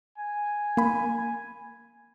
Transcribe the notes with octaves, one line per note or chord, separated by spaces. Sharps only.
G#5
A#3 B5